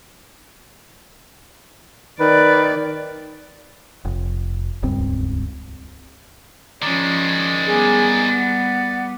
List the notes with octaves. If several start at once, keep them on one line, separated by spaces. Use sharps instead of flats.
D#3 B4 D5
F1
D#1 C#2 G2 C4
D#3 F3 G#3 C#4 D5
G3 B3 G#4 G#5
F#5